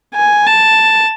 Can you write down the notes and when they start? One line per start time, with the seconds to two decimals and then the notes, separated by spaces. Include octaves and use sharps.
0.15 G#5
0.47 A5